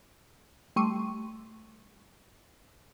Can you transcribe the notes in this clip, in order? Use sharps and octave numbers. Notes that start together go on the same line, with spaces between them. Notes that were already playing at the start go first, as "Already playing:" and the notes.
G3 A3 C6 C#6 D#7